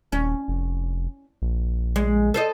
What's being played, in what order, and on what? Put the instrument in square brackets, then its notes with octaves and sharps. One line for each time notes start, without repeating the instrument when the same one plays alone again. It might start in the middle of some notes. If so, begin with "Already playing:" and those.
[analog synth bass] D#1 [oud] C#4
[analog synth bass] F1
A#1
[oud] G#3
A4 C5 D#5